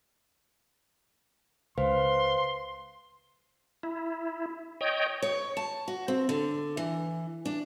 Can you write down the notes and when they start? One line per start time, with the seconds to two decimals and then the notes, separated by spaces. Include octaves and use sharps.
1.78 C#2 B4 C5 F5 C6
3.83 E4
4.81 C#5 D#5 G5
5.22 C#5
5.57 A5
5.88 F#4
6.08 C4
6.29 D3
6.77 E3
7.46 D4